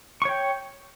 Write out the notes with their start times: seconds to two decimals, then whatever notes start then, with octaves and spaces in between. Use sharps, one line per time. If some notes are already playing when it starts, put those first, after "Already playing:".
0.22 C#6
0.25 C#5
0.29 G5